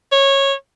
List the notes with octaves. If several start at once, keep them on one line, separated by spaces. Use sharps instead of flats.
C#5